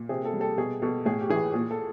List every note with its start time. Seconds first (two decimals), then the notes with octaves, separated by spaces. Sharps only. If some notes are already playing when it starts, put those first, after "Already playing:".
Already playing: A#2
0.09 C3 G#4
0.25 A4
0.33 G3
0.41 A4
0.58 B2 G#4
0.82 B2 A4
1.05 A2 G#4
1.21 G4
1.30 E3 G#4
1.54 A#2 G#4
1.71 A4